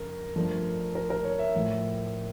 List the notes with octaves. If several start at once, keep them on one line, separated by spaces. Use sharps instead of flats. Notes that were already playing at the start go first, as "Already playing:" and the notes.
Already playing: F2 C#3 A#4
G2 F3 A3
A#4
A#4
C#5
E5
A2 F3 A3